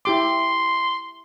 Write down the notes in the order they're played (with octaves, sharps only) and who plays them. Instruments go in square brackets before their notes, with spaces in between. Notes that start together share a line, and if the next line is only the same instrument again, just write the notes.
[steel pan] E4 G4 D6 [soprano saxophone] C6